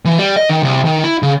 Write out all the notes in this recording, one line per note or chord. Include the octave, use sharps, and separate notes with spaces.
E3
G3
D#5
D#3
C2
D#3
E4
C#3